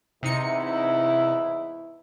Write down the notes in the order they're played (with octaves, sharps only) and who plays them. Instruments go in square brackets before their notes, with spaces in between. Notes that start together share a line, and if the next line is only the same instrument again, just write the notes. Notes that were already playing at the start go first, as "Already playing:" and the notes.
[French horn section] E2 G#2 E4 [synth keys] C3 D#4 C#7